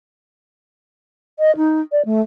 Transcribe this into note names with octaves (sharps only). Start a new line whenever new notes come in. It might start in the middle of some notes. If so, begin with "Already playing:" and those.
D#5
D#4
D5
A3